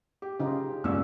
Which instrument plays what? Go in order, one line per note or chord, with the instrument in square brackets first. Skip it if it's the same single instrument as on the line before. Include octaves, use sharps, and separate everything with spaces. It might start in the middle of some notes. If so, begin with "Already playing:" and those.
[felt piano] G4
[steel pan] C#3 D#4 F4
[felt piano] C#2 D5 E6 [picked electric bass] F#2 A#3 C#4